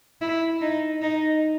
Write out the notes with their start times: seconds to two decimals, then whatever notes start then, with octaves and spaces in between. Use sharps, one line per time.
0.21 E4
0.61 D#4
1.02 D#4